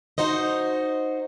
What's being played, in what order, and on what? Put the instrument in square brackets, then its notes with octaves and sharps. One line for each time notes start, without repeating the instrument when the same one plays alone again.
[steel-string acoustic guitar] D#4 F#4 C5 D#5